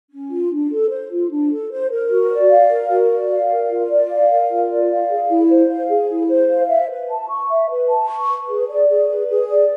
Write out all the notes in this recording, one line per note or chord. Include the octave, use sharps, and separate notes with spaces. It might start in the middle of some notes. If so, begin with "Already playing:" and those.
C#4
F4
D4
A4
C5
F4
D4
A4
C5
A#4
F#4
D5
F5
A#4
F#4
D5
F5
A#4
F4
D5
F5
A#4
F4
D5
F5
G#4
E4
C5
F5
G#4
E4
C5
F5
E5
B4
A5
C#6
E5
B4
A5
C#6
B4
G#4
D5
G#4
B4
G#4
D5